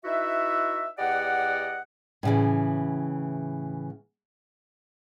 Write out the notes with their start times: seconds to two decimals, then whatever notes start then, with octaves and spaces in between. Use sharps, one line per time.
0.05 D#4 E4 F#4 B4 E5
0.99 E2 G4 D5 D#5 F#5
2.23 A2 C#3 E3